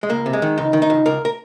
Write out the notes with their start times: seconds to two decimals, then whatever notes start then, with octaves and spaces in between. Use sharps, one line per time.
0.03 G#3
0.10 C#2 A#3
0.26 C3
0.33 G#3
0.42 D#3
0.58 C#2 D#4
0.73 D#3
0.82 D#4
0.90 C#2
1.06 C#2 A#4
1.25 A#4